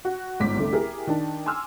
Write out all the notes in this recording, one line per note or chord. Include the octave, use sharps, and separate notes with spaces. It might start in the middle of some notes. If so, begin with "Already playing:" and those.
F#4
G1 G#2 D6 B6
C2 D3 A3
E4 G4 G#4 A#4
D#3 D4 A5
G#5 C6 D6 E6 F6